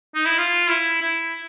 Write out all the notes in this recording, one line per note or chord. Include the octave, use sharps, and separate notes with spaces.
D#4
E4
F4
E4
E4